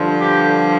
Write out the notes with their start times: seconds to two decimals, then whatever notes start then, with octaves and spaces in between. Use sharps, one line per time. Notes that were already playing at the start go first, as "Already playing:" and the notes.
Already playing: G2 D3 F3
0.20 G4